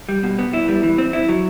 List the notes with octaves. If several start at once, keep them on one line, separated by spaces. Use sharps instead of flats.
G3
B2
B3
E4
G3
E3
C4
E4
F#3